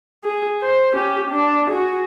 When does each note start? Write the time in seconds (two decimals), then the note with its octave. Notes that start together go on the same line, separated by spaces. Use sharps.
0.24 G#4
0.61 C5
0.93 C#4 G4
1.30 D4
1.67 F#4 G#4